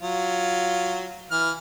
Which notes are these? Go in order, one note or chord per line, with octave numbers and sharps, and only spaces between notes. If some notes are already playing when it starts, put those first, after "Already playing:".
F#3 F4
E3 F6